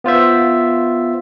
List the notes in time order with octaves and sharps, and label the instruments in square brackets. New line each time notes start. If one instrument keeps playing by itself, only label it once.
[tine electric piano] B3 F4 C5 E5